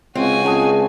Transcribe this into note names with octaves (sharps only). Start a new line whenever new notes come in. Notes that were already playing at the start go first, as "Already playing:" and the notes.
C#2 C4 F#4 G#5
C#2 G#4 A5 D#6